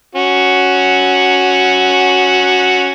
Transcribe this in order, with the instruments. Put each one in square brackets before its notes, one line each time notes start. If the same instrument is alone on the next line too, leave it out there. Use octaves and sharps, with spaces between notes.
[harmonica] C#4 F#4